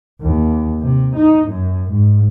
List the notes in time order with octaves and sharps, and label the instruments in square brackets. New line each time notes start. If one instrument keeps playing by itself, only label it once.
[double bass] D#2
C3
D#4
F#2
G#2